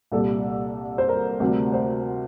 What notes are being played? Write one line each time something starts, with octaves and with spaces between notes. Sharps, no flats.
C2 A#2 G3 A4
C5
A#4
D2 C3 G3
C5